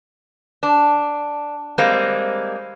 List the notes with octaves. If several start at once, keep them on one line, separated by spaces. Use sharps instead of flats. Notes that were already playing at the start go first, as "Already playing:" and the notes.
D4
G3 G#3 A#3 C4